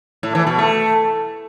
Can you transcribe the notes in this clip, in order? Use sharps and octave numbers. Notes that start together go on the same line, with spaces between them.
A2
E3
B2
A3